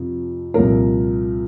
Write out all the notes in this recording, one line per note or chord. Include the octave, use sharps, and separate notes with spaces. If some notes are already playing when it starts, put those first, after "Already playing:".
Already playing: F2 C3 F3
C2 A#2 F3 A#4